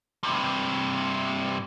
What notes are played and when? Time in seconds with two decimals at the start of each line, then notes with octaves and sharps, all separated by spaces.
0.23 G2 C3